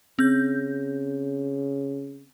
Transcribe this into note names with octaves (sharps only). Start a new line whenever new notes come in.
C#3 C4 G6